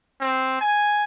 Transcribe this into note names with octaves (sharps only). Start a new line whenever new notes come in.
C4
G#5